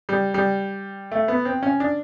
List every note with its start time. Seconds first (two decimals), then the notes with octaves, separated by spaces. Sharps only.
0.09 G3
0.34 G3
1.11 A3
1.28 B3
1.45 C4
1.63 C#4
1.80 D4